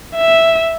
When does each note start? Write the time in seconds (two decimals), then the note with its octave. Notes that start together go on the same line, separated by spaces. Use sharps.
0.17 E5